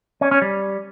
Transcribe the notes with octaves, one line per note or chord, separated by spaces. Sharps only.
C#4
C#4
G3